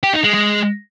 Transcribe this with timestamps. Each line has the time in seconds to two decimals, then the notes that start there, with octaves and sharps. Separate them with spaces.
0.03 G4
0.14 D#4
0.24 G#3
0.34 G#3